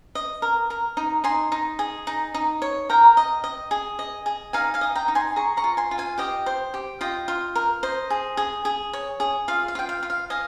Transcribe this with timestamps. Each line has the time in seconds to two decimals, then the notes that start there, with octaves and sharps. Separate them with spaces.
0.15 D#5
0.42 A#4
0.70 A#4
0.97 D#4
1.24 D#4 G#5 C6
1.52 D#4
1.79 G#4
2.07 D#4
2.34 D#4
2.62 C#5
2.89 A#4 G5 A#5
3.17 D#5
3.44 D#5
3.71 G#4
3.99 D#5
4.26 G#4
4.53 D#4 F5 G#5
4.74 F5 G#5
4.81 D#5
4.95 G5 A#5
5.08 D#4
5.15 G#5 C6
5.36 G#4 A#5 C#6
5.57 A#5 C#6
5.64 F4
5.77 G#5 C6
5.91 F4
5.98 F5 G#5
6.18 G4 D#5 G5
6.46 C5
6.74 G4
7.01 F4 D#5 G5
7.28 F4
7.55 A#4
7.83 C5 D#5
8.10 G#4
8.37 G#4
8.65 G#4
8.93 C#5
9.20 G#4
9.48 F4 F5
9.68 F5
9.75 F4 G5
9.89 F5
10.03 F4
10.10 F5
10.30 D#5 F5 G#5